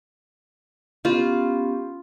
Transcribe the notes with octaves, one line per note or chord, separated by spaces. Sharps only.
B3 C#4 F4 G4